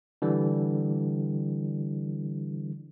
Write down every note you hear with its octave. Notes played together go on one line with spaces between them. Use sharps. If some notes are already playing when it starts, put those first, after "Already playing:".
D3 E3 G3